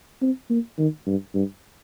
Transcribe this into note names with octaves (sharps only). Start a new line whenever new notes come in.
C4
A#3
D#3
G2
G2